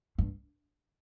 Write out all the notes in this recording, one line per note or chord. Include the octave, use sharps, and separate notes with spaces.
G2